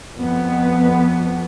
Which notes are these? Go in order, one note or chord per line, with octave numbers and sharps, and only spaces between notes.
F2 B3